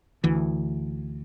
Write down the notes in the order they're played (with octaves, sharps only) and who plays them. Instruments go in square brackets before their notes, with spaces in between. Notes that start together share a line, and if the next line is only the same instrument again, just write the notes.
[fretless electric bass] D2 E3